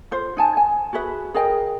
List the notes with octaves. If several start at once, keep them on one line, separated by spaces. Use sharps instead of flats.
F4 C5
D#4 G#5 A5
G#5
F#4 G#4 B4 E5
G#4 A#4 D#5 G5